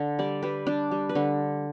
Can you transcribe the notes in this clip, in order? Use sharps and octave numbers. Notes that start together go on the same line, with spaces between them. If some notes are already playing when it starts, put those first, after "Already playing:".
Already playing: D3
G3 D5
G3 B4
G3 D4
G3
B4
D3